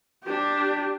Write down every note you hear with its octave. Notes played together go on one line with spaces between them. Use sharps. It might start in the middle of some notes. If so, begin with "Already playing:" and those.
D4 G4